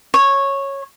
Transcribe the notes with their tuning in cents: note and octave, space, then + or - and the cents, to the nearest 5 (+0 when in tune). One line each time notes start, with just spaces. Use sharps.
C#5 -10